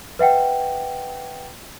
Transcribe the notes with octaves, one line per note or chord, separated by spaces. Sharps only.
B4 E5 F#5 G5